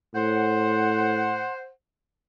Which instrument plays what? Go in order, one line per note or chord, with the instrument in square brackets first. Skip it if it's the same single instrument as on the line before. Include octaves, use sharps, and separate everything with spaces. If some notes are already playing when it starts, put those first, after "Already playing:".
[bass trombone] A2 [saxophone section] C5 F#5